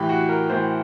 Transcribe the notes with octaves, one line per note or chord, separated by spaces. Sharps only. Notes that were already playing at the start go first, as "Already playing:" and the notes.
Already playing: A2 E3 G4
F#4
A#4
A2 E3 C5